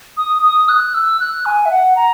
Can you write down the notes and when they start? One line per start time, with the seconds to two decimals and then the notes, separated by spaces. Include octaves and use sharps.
0.17 D#6
0.42 D#6
0.69 F#6
0.94 E6
1.20 F#6
1.46 G#5
1.66 E5
1.71 F#5
1.96 A#5